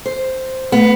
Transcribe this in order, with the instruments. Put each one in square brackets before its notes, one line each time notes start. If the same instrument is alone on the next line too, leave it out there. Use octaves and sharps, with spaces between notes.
[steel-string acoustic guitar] C5
[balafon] A3 [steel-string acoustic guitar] B3